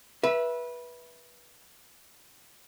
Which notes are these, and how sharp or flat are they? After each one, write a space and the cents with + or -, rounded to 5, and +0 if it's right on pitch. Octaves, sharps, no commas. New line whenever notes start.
B4 -20 E5 +0